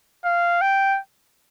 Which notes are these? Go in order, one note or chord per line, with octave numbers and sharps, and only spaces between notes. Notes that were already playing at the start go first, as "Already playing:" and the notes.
F5
G5